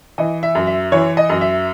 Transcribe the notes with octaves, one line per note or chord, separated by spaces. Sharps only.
E3 D#5
E5
F#2
E5
E3 C#5
D#5
F#2
E5